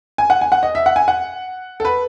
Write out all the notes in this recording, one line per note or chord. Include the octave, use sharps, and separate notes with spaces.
G#5
F#5
G#5
F#5
D#5
E5
F#5
G#5
F#5
A4
B4